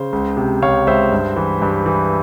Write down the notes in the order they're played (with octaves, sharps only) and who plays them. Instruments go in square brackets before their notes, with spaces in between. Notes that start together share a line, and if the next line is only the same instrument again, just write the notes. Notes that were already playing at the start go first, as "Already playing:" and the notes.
Already playing: [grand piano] C#3 C5
C#2
C3
C#2 C#5 F5
C#2 C5 E5
G2
E3
G2
E3